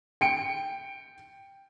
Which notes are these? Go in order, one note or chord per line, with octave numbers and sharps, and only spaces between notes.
G5 C#7 D7